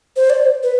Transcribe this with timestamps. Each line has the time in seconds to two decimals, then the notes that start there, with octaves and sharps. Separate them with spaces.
0.16 C5
0.30 D5
0.43 C5
0.63 B4